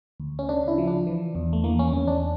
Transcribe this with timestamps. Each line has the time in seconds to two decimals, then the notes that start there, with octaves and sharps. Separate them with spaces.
0.20 D2
0.39 C#4
0.49 C#3 D4
0.68 E4
0.78 F3
0.87 D4
1.07 E3
1.35 E2
1.53 A3
1.64 E3 A#3
1.79 C#4
1.93 E2 C#4
2.08 D4